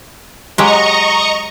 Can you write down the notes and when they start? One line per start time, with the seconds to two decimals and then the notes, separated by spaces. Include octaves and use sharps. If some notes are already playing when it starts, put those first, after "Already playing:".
0.58 F#3 G#3 G4 D#5 A#5 C#6